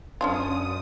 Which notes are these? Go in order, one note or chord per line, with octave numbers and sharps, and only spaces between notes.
F#2 C#4 D4 F4 D#6